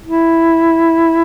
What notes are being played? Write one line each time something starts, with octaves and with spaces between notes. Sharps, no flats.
E4